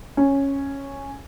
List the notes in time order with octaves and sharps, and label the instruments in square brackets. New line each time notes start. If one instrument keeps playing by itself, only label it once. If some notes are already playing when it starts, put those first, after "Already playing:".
[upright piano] C#4